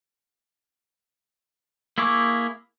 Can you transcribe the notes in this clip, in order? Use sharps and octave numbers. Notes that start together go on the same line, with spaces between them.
A#3 E4 G#4 C#6 D6